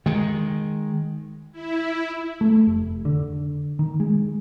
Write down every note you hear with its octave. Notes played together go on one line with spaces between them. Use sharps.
D#3 G#3
E4
A3
F1
D3
D#3
G#3